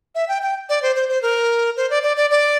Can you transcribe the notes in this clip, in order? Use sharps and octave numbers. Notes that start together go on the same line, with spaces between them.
E5
G5
G5
D5
C5
C5
C5
A#4
C5
D5
D5
D5
D5